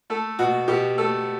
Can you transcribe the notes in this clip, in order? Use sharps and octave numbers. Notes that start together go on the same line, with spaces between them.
A3 A4
B2 F#4
B2 G4
A3 A4